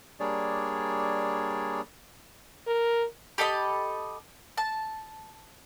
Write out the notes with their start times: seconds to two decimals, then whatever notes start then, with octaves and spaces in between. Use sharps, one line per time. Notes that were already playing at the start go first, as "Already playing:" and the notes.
0.20 G3 A#3 D4 G#4 C#5 D5
2.67 A#4
3.38 G4 A4 D#5 B5
4.57 A5